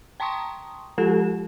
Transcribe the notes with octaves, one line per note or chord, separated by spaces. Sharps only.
G5 A5 A#5 C6 C#6 D#6
F3 G#3 F4 G4 A4 E7